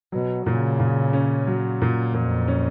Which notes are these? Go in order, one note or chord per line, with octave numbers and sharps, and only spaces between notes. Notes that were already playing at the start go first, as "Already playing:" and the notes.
B2 F#3
A#2 C#3
A#2
C#4
F#3
A#2
F2 A#2
C#4